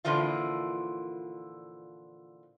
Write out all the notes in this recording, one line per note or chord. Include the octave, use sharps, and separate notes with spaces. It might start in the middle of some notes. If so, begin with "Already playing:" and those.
A#2 D3 E3 F3 F4